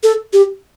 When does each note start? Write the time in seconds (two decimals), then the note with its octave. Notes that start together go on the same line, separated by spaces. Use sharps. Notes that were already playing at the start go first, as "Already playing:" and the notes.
0.03 A4
0.33 G4